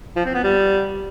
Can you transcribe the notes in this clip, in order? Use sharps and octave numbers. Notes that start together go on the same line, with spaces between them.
F3
C4
B3
G3